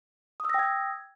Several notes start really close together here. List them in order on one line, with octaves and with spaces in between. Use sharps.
D#6 E6 A#6 G5 G#6